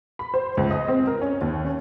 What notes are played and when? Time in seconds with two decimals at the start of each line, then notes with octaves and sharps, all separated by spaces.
0.19 B5
0.34 C5
0.57 C#2
0.71 D#5
0.88 C4
1.07 A#4
1.21 C#4
1.41 D#2
1.65 C#4